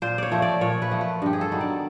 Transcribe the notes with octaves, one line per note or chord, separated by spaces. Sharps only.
A#2 C5
C#5 D5
F3 A3
D5
A#2 C#5
B4
F3 A3
B4
G2 G4
G#4
A4
D#3 F#3 B3
D5